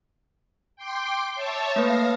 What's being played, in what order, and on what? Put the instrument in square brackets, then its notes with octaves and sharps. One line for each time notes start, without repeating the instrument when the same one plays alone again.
[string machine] G5 C6 D6
C#5 E5 A5
[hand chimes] A3 A#3 B4 [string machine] F5 A#6